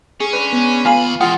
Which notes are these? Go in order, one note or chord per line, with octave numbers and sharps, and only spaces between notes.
C#4 G#4
G#3 D4 B4
B3
D#2 F4 F5 G#5 B5
E3 G#3 F4 F#5 G5